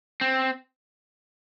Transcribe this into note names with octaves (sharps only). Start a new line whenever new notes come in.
C4